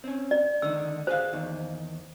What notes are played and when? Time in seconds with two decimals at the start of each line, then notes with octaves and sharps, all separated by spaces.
0.04 C4 C#4
0.31 D5
0.62 D3 D#3 E6
1.07 G4 G#4 C5 F5
1.33 E2 D#3